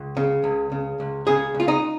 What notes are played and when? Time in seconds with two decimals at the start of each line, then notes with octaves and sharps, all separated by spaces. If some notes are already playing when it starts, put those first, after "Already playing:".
Already playing: C#2
0.17 C#3
0.44 C#2
0.72 C#3
1.00 C#2
1.27 C#3 G#4
1.54 C#2
1.60 F4
1.68 D#4